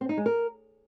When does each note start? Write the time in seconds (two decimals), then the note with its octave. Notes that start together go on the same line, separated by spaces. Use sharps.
0.01 C4
0.09 D#4
0.17 G#3
0.26 A#4